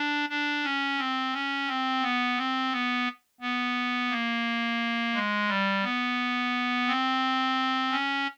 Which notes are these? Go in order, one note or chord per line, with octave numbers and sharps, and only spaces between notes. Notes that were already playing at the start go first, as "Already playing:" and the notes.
Already playing: D4
D4
C#4
C4
C#4
C4
B3
C4
B3
B3
A#3
G#3
G3
B3
C4
C#4